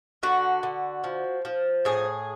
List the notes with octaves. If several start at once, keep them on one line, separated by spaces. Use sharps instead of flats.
D3 F#4
D3
F3
F3
A2 G#4